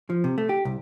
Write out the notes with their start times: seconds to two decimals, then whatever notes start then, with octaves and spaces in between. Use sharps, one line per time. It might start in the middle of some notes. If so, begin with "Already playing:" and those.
0.10 F3
0.24 C3
0.38 A3
0.49 G4
0.65 C2